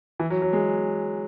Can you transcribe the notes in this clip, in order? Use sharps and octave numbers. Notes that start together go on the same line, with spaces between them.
E3
F#3
F#3
G#3